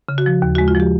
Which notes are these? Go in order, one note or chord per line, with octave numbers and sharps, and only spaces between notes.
C#3
F#4
F3
D#2
F#4
G#3
F4
F3 G4